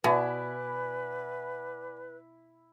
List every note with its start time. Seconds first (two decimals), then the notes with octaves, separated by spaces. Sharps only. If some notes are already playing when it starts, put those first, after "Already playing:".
0.04 B2 E4 B4 D5 F#5 G#5